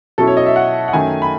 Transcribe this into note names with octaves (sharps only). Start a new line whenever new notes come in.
B2 F#3 C#4 E4 A4
C#5
D#5
E5
F#5
F#5
F#2 D#3 A3 G#5
B5